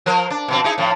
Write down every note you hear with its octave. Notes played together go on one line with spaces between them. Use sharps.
F3 A#4 C5
D4
B2 F3 C4
D#4 E4 G#4
A2 F3